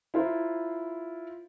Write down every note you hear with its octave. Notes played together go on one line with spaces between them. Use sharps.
E4 F4 C5 A#5